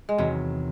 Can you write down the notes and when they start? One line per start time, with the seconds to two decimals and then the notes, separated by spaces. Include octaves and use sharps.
0.09 G#3
0.18 E2 C3 D#3 F#3